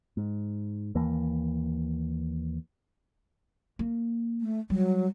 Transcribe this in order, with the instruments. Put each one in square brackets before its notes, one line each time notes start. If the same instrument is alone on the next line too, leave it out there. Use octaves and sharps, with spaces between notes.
[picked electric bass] G#2
D#2 E3 A#3
[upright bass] A#3
[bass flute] A3
[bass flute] F#3 [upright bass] G3